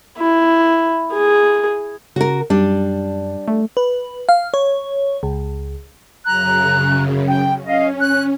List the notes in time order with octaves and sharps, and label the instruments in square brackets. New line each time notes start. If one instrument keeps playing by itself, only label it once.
[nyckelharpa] E4
G#4
[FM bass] C#3 [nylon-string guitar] F#4 A#4
[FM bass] F#2 [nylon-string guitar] G3 D4
[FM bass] A3
[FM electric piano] B4
F5
C#5
C#2
[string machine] F#2 C#3 [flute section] A#5 F#6
[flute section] G5
[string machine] C#4 [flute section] D#5 F5
[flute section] F#6